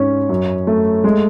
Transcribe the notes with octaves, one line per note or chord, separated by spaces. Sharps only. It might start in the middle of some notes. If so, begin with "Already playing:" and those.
Already playing: G#2 C#4
F#2
A3
G#3